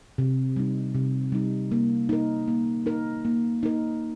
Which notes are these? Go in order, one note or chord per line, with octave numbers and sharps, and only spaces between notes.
C3
G3 D#4
C3
G3 D#4
A#3
D#4 A#4
A#3
D#4 A#4
A#3
D#4 A#4